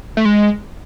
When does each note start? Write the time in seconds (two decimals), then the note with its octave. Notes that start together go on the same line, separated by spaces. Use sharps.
0.17 A3
0.25 G#3